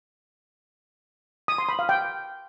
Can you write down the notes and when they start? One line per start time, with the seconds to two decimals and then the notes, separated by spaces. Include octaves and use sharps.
1.48 D#6
1.58 C6
1.69 B5
1.79 F5
1.89 G5